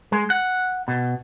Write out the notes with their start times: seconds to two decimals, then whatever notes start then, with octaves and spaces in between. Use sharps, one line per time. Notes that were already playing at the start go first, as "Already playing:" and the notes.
0.12 G#3
0.30 F#5
0.88 B2